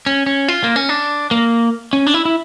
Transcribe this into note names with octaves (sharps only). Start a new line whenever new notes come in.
C#4
C#4
F4
A#3
C#4
D4
A#3
C#4
D4
E4
E4